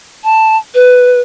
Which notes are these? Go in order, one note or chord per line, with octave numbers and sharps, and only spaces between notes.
A5
B4